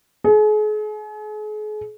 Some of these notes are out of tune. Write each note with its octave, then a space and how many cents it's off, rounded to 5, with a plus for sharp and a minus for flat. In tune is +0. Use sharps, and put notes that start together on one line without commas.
G#4 +40